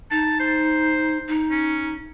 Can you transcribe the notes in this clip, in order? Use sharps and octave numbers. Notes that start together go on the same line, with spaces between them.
D#4 A5
C5
D#4
C#4